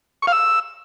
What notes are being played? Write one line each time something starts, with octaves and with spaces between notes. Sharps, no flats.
C#6
F5
E6